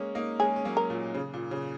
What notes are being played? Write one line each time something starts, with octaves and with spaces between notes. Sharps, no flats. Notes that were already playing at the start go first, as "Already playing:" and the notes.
Already playing: G#3 A#3 C#4
A#3 D#4
G#3 C#4 G#4
C#4
F#3 A#3
A#4
A#2
C#3
A#2
C#3